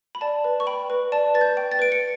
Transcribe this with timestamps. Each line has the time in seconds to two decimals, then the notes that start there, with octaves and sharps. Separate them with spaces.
0.15 B5
0.21 D5 A5
0.44 B4
0.60 C#6
0.67 G5 B5
0.90 B4
1.12 D5 A5
1.34 B4 A6
1.41 G6
1.57 G5
1.72 A6
1.79 B4 D7
1.92 C#7